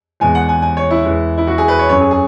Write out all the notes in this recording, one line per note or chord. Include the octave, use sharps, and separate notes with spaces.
E2 B2 G#3 G#5
F#5
G#5
G#5
C#5
E4
E2 E3 G#3
E4
F#4
G#4
B4
C#5
F#2 F#3 C#5
G#4
G#4